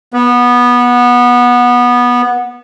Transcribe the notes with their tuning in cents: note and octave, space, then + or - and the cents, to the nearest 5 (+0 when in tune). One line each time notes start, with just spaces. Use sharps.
B3 -15